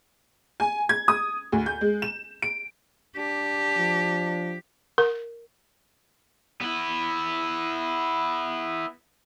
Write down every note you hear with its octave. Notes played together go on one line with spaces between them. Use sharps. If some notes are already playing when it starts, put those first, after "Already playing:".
G#5
G#6
D#6
D2
G6
G#3
E7
D7
D4 G4
F3
A#4
B3 E4